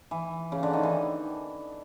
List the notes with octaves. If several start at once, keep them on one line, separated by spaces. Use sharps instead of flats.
E3
C#3
D3
D#3
E3